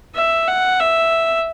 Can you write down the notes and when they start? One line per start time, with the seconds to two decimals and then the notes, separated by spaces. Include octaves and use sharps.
0.15 E5
0.47 F#5
0.80 E5